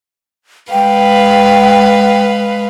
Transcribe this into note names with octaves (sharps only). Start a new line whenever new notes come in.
G#3 B4 F5 G5